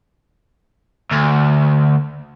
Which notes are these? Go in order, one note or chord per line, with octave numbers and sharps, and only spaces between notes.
D2